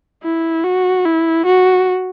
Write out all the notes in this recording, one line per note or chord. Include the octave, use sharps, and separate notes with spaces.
E4
F#4
E4
F#4